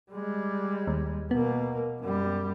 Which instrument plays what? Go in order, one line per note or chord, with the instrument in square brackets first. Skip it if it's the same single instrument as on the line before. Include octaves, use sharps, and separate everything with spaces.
[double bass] G3 G#3
[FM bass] D#2
[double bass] B2 A#3 [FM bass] B3
[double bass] F#2 G3